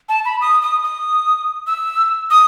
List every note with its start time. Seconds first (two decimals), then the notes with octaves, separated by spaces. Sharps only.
0.09 A5
0.25 B5
0.41 D#6
0.62 D#6
0.83 D#6
1.67 E6
2.31 D#6